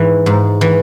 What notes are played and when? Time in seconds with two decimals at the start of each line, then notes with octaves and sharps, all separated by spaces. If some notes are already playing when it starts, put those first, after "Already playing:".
Already playing: G#2 E3 E4
0.26 G#2
0.61 E3